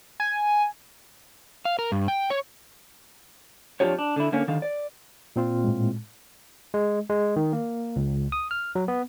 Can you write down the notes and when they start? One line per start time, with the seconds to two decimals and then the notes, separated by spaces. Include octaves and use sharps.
0.20 G#5
1.65 F5
1.79 A#4
1.92 G2
2.08 G5
2.30 C#5
3.80 F2 F3 D4 F4 G4 C#5
3.99 D4
4.16 D3 E4
4.32 D3 A#3 C#4
4.48 D3 D#3 F5
4.62 D5
5.36 A#2 C4 F4
5.64 A2 G#3
6.74 G#3
7.10 G#3
7.36 D#3
7.53 A#3
7.96 C#2
8.32 D#6
8.51 F6
8.75 F#3
8.88 B3